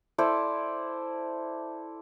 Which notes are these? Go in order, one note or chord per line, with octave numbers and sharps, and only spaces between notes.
E4 A4 C5 D5